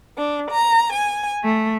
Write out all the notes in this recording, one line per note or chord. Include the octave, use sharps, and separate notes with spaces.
D4
A#5
G#5
A3